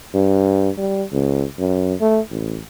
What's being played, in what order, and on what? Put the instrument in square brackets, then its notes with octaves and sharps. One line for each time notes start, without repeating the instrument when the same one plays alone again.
[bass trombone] G2
G3
C#2
F#2
A3
A1